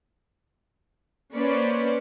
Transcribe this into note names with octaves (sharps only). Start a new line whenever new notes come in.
A#3 C#4 B4 C5 D5